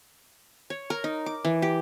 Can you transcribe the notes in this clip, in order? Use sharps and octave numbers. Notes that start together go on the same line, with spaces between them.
C#5
A#4
D#4
D6
E3
G4